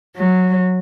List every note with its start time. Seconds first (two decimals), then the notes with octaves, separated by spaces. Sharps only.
0.16 F#3